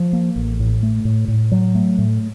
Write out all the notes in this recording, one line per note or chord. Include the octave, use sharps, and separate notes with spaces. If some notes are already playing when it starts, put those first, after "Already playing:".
Already playing: F3
A#3
A1
A2
A3
A2
A2
F#3
A3
A2